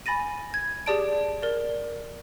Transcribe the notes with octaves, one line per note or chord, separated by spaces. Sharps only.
G#5 B5 A6 A#6 D#7
G#6
G4 G#4 D5 A5 D7
A#4 D5